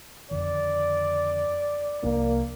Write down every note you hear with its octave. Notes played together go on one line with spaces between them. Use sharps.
F2 D3 D#3 D5
C2 F3 A#3 D4